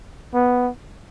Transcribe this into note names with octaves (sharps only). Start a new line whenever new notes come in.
B3